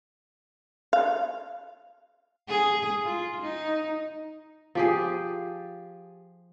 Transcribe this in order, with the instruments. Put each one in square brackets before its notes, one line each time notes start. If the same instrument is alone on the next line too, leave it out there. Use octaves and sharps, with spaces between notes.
[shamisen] F5
[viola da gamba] G#4
F4
D#4
[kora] F3 G4 G#4